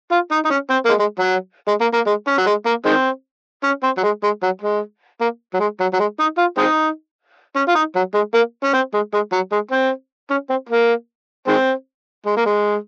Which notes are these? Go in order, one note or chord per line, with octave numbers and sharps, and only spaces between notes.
F4
D#4
D#4
C#4
C4
A#3
G#3
G#3
F#3
G#3
A#3
A#3
G#3
C#4
F#3
G#3
A#3
D#3 G#3 C4
C#4
C4
F#3
G#3
G#3
F#3
G#3
A#3
F#3
G#3
F#3
F#3
G#3
D#4
F4
G#3 C4 D#4
C#4
F4
D#4
F#3
G#3
A#3
C#4
C4
G#3
G#3
F#3
G#3
C4
C#4
C4
A#3
D#3 G#3 C4
G#3
A#3
G#3